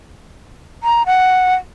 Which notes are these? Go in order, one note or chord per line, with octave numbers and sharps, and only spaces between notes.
A#5
F#5